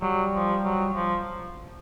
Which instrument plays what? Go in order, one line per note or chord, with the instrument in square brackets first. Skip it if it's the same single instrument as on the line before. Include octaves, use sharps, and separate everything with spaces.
[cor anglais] F#3 [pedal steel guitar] G3
[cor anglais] F3
F#3
F3